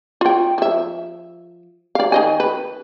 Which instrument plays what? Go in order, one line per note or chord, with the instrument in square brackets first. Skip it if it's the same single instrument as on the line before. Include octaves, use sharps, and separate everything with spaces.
[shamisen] F4 G5
F3 E5
D5 F5
D#3 D#5 G#5
B4